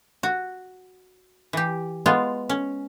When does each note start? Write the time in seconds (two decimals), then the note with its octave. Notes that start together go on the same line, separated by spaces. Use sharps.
0.23 F#4
1.53 E3 G4
2.06 G#3 B3 F4
2.49 C#4